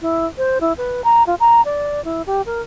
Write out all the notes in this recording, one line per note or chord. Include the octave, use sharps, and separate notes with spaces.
E4
C5
E4
B4
A#5
F4
A#5
D5
E4
G4
A#4